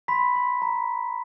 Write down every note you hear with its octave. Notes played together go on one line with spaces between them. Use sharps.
B5 C6 B6
C6
A#5